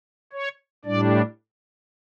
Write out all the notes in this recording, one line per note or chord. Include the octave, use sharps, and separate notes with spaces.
C#5
A2 G3 D4 D5